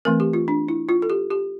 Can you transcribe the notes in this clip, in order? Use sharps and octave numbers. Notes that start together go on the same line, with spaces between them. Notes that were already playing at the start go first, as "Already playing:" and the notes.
E3 A3 C4 A#4
G4
F4
D4
E4
F4
A4
G4
G4